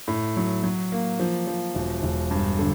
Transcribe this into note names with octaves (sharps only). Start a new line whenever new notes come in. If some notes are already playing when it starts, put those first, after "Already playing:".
A2
F#3
F#3
A#3
F3
F3
E1
E1
G2
D3